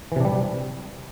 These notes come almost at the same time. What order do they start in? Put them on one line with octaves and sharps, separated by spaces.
E3 C3 D4 G3